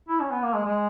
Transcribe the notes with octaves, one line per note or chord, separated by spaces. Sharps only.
E4
C#4
B3
A#3
G#3
G#3